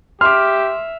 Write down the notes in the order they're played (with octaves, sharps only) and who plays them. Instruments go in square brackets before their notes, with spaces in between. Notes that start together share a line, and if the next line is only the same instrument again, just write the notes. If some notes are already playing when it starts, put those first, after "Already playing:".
[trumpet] G4 [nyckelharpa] E5 [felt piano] C6 D6 [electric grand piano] F6